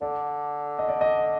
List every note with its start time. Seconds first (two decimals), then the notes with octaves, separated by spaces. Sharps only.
0.01 D3 D5
0.79 D#5
0.89 D5
1.01 D#5